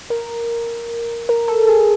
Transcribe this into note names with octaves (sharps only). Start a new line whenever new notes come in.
A#4
A#4
A4
G#4